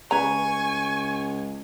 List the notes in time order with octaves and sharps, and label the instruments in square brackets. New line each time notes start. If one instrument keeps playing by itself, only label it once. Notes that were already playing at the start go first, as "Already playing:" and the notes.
[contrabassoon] C#2 [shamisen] B4 A#5 [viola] G#5 C#6